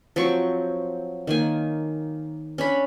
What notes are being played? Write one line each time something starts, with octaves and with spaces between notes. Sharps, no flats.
F3 F#3 C4 C#6
D#3 A#3 G#5
C#4 D4 B5